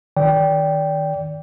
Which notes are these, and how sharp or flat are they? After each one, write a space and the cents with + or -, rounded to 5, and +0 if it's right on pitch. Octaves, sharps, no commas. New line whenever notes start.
D#3 +0 D5 -25 G5 +0